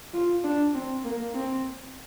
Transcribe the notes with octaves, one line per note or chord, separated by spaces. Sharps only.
F4
D4
C4
A#3
C4